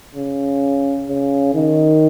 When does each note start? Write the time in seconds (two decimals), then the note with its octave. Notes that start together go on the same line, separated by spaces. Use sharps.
0.15 C#3
1.08 C#3
1.55 D#3